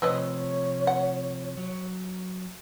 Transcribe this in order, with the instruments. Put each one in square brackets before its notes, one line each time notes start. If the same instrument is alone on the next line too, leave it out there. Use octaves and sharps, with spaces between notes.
[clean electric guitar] C3 F3 [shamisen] C4 B4 D#5 [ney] C#5
[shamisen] F#5
[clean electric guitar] F#3